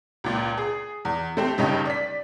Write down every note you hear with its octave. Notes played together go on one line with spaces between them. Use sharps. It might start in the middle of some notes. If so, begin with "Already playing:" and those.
C#2 A#2
G#4
E2
A3 C4 G4
G1 G2 C#3 D#4 G4
D5 B6